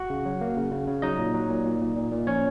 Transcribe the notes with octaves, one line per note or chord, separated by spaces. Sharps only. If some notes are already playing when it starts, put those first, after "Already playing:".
Already playing: F#4 F#5
C#3
F#3
A#3
C#3
C#3
C#3
F#3 D#4 D#5
A#2
F#3
A#2
A#2
A#2
A#2
A#2
F3 C#4 C#5